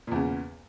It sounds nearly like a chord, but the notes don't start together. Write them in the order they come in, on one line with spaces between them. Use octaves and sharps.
A#2 E2 C#3